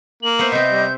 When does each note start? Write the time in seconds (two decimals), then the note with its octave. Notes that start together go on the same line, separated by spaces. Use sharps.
0.23 A#3 F#7
0.39 B3 C5 E5
0.52 C3 C4 D#5 G6
0.71 G3